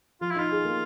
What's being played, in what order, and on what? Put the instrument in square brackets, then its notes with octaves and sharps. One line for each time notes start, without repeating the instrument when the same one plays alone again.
[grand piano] F3 [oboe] F4
[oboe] E4
[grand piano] D#4 [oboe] F4
[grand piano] G#4
A#3